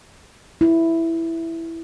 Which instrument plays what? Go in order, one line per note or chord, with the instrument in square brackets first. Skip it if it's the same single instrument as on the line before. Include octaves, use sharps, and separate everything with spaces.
[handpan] E4